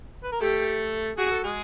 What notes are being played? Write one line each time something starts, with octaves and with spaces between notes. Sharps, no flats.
B4
A#4
A3 G4 A4
F#4 G#4
A4
G#3 G#4